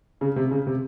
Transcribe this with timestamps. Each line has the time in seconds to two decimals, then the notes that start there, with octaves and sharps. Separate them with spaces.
0.21 C#3
0.36 C3
0.51 C#3
0.67 C3